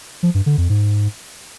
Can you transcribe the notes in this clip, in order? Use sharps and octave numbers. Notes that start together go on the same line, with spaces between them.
F3
G2
D3
F2
G#2